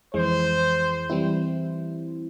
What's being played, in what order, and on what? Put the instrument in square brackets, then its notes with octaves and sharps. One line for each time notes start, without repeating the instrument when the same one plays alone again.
[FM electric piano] F2 E3 G#3 [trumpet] C5
[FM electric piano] E3 G3 C4 E4